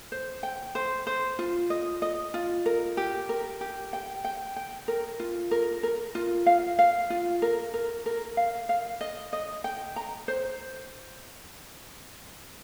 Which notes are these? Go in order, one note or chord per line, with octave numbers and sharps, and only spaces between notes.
C5
G5
C5
C5
F4
D#5
D#5
F4
A#4
G4
A#4
G4
G5
G5
G5
A#4
F4
A#4
A#4
F4
F5
F5
F4
A#4
A#4
A#4
F5
F5
D#5
D#5
G5
A#5
C5